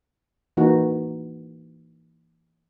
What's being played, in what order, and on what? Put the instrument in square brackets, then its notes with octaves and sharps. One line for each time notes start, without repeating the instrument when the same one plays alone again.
[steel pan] E3 A#3 D#4 F#4